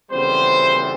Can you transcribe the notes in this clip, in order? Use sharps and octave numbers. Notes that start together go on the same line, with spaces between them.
F2 C#3 E3 G3 B3 C5